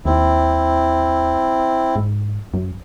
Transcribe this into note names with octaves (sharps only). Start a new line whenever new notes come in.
D#2 C4 E4
G#2
F#2